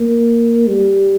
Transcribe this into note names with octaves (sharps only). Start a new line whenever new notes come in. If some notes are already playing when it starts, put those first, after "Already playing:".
Already playing: A#3
G3